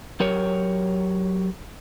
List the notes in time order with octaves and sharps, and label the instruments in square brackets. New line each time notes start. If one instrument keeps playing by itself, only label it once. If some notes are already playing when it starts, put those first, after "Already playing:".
[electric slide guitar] F#3 G4 A#4 C#5